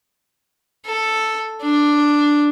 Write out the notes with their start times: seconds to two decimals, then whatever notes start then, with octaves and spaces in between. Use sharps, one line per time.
0.86 A4
1.62 D4